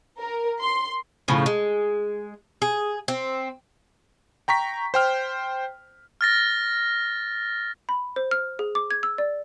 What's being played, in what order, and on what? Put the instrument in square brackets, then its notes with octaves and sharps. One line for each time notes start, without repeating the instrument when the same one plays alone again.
[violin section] A#4
C6
[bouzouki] A2 C#3 F3
G#3
G#4
C4
[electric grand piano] G5 A#5 C#6 B6
C5 G5 F6
[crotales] F6 A6 A#6
[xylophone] B5
C5
F6
G#4
D6
G#6
E6
D5